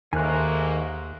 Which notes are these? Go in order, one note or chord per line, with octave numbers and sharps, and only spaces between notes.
D#2 G#2 D#3 A3 A#3 G#5 F#6